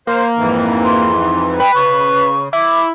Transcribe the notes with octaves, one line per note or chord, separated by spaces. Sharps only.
A#3 C5
F2 G#2 E3
C6
B4 G5
C#3 C#6
E4 D6